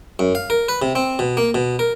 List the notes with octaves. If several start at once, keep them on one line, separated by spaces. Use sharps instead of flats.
F#2
F5
A#4
B4
C3
C4
B2
A#3
B2
A#4